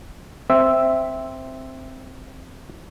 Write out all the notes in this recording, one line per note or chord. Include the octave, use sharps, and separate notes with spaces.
C4 E5